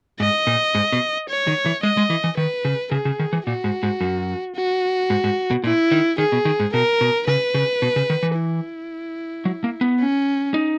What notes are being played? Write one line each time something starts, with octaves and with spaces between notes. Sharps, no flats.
G#2 D#5
A#2
G#2
B2
C#5
D#3
E3
G#3 D#5
G#3
E3
E3
D#3 B4
C#3
C#3 G#4
C#3
D#3
E3
A#2 F#4
G#2
G#2
F#2
F#4
G#2
G#2
B2
A#2 E4
D#3
D#3 G#4
B2
D#3
G#2
B2 A#4
B2
C#3 B4
C#3
B2
C#3
D#3
E3
E4
F#3
A#3
B3
C#4
D#4